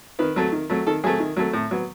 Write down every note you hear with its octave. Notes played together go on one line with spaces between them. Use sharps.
D#3 B4
F#3 A3
D#3
F#3 A3
D#3 A4
F#3 A3 G#4
D#3
F#3 A3
A2
F#3 B3